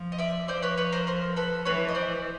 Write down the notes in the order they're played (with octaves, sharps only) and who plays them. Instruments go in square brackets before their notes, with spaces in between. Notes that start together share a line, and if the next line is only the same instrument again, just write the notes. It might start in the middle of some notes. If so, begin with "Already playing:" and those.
Already playing: [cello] F3
[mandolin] D#5
D5 E5
[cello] F3 [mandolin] C5 D5
[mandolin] B4 C#5
B4 C#5
A#4 C5
A#4 C5
A4 B4
[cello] E3 [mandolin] B4 C#5
[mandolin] D#5
C5 D5